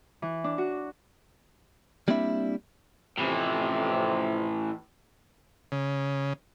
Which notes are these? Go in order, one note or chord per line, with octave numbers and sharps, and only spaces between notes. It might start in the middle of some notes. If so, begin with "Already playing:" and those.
E3
D4
F#4
G3 A#3 C4 D4 E4 E5
F2 A2 C3 E3
C#3